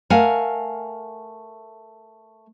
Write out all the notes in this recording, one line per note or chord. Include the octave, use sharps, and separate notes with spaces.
A3 A#4 F5 F#5 G#5